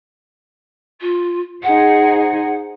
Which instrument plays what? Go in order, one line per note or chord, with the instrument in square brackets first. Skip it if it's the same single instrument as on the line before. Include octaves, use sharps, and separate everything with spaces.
[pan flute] F4
[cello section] D#4 G#4 C5 [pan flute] F#5